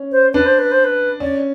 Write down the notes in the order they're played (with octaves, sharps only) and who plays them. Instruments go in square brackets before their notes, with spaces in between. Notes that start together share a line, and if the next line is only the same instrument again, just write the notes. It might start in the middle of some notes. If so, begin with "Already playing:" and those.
Already playing: [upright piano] C#4
[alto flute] C5
[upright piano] D4 [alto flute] B4
[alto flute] C5
B4
C5
B4
[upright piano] C#4 [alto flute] D5